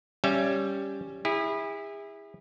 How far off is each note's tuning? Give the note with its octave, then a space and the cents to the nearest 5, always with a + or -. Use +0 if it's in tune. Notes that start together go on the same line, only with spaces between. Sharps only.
G3 +0 C#4 +0 E5 +35
E4 -15 G#4 -40